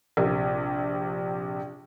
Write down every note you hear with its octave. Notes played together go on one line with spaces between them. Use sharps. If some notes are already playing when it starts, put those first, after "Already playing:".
A#1 C3